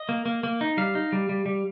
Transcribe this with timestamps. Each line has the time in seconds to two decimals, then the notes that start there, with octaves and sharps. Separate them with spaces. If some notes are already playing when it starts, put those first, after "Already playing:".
Already playing: D#5
0.09 A#3
0.26 A#3
0.43 A#3
0.61 D#4
0.77 G3 F5
0.95 D#4
1.12 G3
1.29 G3
1.46 G3